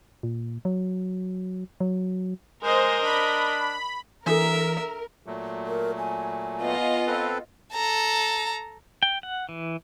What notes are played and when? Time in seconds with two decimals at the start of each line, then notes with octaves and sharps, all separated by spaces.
0.23 A#2
0.65 F#3
1.80 F#3
2.63 G#3 A#4 C5 D#5
3.03 D4 B5
4.26 E3 D4 F#4 A4 A#4 E5
5.26 A#2 F#3 A3
5.67 A#4
5.98 G#5
6.61 B3 F4 D#5
7.07 C4 A4 B4
7.74 A4 A#5
9.03 G5
9.23 F#5
9.49 E3